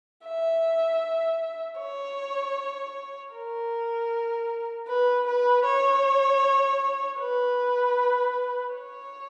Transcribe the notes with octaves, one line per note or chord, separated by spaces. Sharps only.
E5
C#5
A#4
B4
B4
C#5
B4
C#5